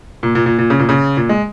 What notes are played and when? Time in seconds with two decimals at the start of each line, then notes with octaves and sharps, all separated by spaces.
0.23 A#2
0.35 A#2
0.46 A#2
0.59 A#2
0.70 C#3
0.79 A#2
0.89 C#3
1.17 A#2
1.29 G#3